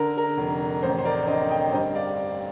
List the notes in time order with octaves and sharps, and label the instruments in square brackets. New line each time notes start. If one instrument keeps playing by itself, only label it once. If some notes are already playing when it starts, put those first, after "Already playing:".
Already playing: [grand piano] D3 A#4
A#4
F1
A1 C5
C5
A#4 D5
D3 C5 D#5
D#5 G5
G2 C5 D#5
D5 F5